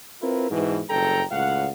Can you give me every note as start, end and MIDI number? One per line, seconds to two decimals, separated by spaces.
0.21 0.48 60
0.21 0.48 64
0.21 0.48 65
0.21 0.48 70
0.21 0.48 71
0.50 0.80 44
0.50 0.80 47
0.50 0.80 52
0.89 1.23 30
0.89 1.23 43
0.89 1.23 69
0.89 1.23 79
0.89 1.23 82
1.31 1.69 37
1.31 1.69 45
1.31 1.69 77
1.31 1.69 78